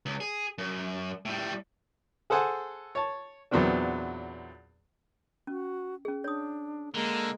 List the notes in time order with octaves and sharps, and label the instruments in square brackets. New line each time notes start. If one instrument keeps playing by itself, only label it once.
[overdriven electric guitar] C#2
G#4
F#2
A2 G3
[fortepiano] G#4 A4 C5 F#5 G#5 A5
C#5 A5
E2 A#2 F#3 B3 C4 D4
[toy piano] C#4 [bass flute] F#4
[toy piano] C#4 G#4
[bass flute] D4 [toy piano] C#5 D#6
[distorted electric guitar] D3 [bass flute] G#3 [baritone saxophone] A#3